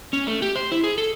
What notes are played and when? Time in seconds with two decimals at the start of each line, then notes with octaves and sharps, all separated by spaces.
0.13 C#4
0.27 A3
0.42 G4
0.55 C5
0.72 E4
0.84 G#4
0.98 A4